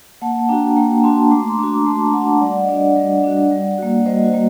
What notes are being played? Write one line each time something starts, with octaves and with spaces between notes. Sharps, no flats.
A#3 F#5 A5
D4 F#4 G5 A#5
A#3 G5 A#5
D4 F#4 A5 C6
A3 A#5 D6
C6
D4 F#4 A#5 D6
D6
A3 A5 C6
C6
A#5
D4 F#4 F#5 A5
G3 D5 F#5
D#5
D4 F#4 D5 F#5
G3
D4 F#4
G3
A#3 F#4
G3 C5 D#5
F#4
A#3